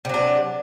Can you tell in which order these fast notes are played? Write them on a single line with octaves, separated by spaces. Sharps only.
C3 F#3 D4